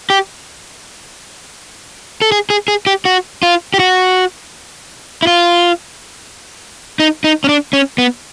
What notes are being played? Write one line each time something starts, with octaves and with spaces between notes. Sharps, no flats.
G4
A4
G#4
G#4
G#4
G4
F#4
F4
G4
F#4
E4
F4
D#4
D#4
C#4
D4
C#4
B3